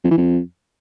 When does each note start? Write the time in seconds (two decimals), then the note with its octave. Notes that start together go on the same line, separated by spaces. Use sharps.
0.04 F2
0.11 E3
0.17 F2